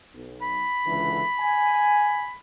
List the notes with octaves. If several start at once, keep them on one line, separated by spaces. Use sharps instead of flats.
B1
B5
C#2 D3 E3
G#5